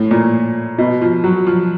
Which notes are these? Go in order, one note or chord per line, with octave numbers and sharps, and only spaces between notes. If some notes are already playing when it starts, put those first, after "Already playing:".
Already playing: A2
A#2
B2
F3
F#3
F3